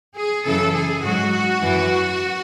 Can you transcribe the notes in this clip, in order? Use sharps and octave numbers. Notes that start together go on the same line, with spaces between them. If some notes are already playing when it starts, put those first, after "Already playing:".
G#4
F#2 C#3 E3 A4
G#4
G#2 F#3 F#4
F#2 E3